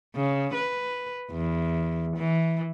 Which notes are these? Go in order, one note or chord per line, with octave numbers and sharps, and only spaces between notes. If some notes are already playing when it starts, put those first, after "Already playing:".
C#3
B4
E2
E3